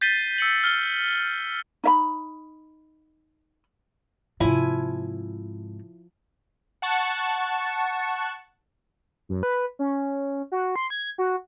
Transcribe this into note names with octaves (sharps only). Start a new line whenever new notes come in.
G6 A6 B6 C7 D#7 G7
E6 C#7 F#7
F6 G7
D#4 E5 B5
G#2 C3 F3 E4 G#5
F#5 A5 C#6
F#2
B4
C#4
F#4
C6
G#6
F#4